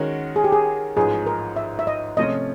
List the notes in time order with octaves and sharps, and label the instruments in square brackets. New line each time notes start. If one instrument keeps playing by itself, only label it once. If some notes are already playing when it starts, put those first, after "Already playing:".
Already playing: [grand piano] D#3 G#3 C#4 F#4 A#4
[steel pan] G#4
G4
G#4
[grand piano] A1 G#2 F3 [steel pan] G#4
[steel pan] A#4
E5
E5
D#5
[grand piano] C3 F3 A3 C#4 F4 [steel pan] D#5